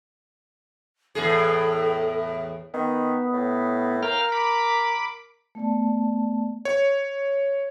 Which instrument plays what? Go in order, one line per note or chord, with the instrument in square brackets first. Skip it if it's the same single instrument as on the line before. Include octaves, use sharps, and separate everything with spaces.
[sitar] E2 A2 G#4 [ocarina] A4
[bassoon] D#3 [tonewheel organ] B3
[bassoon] A2
[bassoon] A#4 [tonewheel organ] F5 G5 F6
[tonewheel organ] B5 D6
[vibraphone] A3 B3 D5 A5
[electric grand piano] C#5